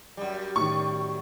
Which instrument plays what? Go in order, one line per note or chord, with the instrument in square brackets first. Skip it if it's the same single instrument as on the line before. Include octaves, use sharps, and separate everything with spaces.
[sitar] F#2 G3
[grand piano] A2 D#3 [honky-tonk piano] C#6